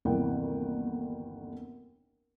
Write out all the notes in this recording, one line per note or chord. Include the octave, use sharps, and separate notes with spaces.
G1 D#2 C3 E3 F#5 G5